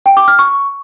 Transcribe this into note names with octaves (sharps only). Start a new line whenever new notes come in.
G5
D6
F6
C#6